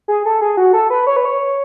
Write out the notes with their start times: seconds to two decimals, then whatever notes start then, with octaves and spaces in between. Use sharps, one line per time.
0.08 G#4
0.26 A4
0.41 G#4
0.57 F#4
0.73 A4
0.90 B4
1.07 C#5
1.16 B4
1.25 C#5